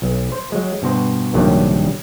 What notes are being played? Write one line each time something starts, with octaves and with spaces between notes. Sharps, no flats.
B1
C5
F#3 G#3
G2 B2 F#4 C5
A#1 G2 C3 D#3 F#3 G3